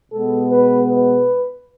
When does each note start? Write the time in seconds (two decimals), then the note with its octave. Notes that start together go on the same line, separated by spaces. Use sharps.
0.12 B2 G#3 B3 A4
0.51 B4
0.90 B4